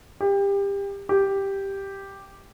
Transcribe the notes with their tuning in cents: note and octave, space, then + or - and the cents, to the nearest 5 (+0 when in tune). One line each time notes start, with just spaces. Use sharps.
G4 +25
G4 +0